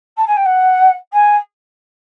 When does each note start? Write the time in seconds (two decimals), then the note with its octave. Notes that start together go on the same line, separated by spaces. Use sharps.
0.17 A5
0.27 G#5
0.36 G5
0.45 F#5
1.12 G#5